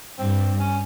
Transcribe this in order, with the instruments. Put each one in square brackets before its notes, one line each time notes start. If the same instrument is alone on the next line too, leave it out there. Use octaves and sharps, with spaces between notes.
[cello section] G2 [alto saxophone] C4
[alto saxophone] C#4